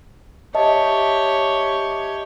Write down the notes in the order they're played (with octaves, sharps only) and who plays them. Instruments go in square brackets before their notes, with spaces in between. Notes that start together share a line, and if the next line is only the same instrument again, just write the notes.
[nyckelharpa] G4 C#5 [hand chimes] D#5 E5 A5